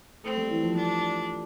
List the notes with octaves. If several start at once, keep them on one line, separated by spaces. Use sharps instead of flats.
A3 C4
G3
E3
F3
G3 D4